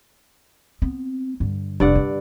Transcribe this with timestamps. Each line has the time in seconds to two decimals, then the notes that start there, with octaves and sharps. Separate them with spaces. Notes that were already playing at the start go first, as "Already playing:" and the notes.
0.82 B3 C4
1.40 G2 D3
1.80 F1 G2 F3 D5 F#5
1.95 D3